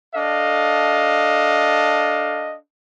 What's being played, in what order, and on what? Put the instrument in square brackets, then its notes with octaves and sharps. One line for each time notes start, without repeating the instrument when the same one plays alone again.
[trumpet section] D4 A4 D#5 F5